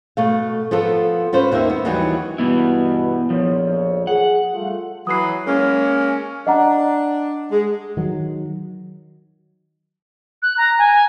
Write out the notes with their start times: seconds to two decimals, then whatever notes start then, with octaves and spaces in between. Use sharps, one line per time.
0.17 B2 A3 F5
0.71 F3 B3 F4 A4
1.33 C#4 F4 B4 C5
1.52 D#2 A#3 D#4 A#4 E5
1.70 B3
1.85 D#2 E3 F#3 G3 B3 D#4
2.38 G2 B2 B3 E4
3.30 A#1 F2 F3 C#5
4.07 G#4 F#5
4.53 G3 A3 F4
5.07 E3 F#3 D#6 C7
5.46 G#3 A#3 C#4
6.47 D4 D#5 F#5 A#5
7.51 G#3
7.97 D#3 F#3
10.42 F#6
10.57 A#5
10.79 G#5